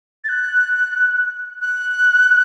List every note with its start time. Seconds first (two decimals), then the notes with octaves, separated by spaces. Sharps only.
0.24 A6
0.29 F#6
1.62 F#6